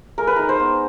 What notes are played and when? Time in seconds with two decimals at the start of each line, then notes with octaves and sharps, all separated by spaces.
0.18 G#3 A#4
0.27 B4
0.36 D#4 A#4
0.49 C5
0.59 B3